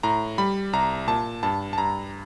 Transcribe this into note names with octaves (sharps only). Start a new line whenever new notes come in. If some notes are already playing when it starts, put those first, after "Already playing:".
A2 A#5
G3 B5
C2 A#5
A#2 A5
G2 A5
A5
G2 A#5